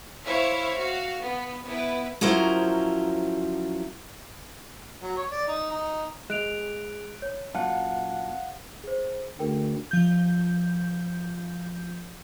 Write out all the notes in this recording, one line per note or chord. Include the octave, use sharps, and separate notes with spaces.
E4 C5 C#5 E5 F5
F#4 F5
B3
B3 E4 B4
F3 F#3 C#4 E4 A#4 C5
F#3
C#5
D5
D#4
D#4
G#3 F#6 D7 F7
C#5
F#2 A#2 F5 F#5 A5
G#4 C5
D2 G#4 A#4 G5
F3 G6